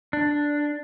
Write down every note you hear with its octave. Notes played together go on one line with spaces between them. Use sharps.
D4